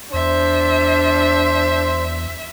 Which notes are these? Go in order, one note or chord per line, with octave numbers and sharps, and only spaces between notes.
E2 D4 C5 E5